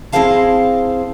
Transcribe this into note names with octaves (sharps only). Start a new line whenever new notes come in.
C4 E4 G#4 C5 F5 A5